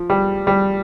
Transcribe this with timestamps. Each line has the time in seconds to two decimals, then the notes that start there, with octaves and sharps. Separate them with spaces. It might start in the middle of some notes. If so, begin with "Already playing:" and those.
Already playing: F3
0.10 G3
0.47 G3